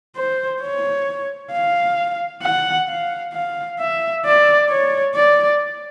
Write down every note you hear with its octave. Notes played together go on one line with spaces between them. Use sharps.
C5
C#5
F5
F#5
F5
F5
E5
D5
C#5
D5